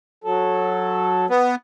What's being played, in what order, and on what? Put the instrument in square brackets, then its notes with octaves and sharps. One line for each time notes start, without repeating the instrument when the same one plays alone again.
[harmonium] F#3 A4
[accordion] B3